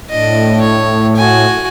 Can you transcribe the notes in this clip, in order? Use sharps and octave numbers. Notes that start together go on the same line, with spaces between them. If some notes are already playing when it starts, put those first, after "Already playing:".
A2 D4 D#5
C#5
F#4 G#5